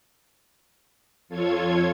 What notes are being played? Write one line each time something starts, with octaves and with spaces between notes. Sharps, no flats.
F2 F4 A4 C#5 G#6